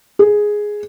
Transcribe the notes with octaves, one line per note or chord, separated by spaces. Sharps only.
G#4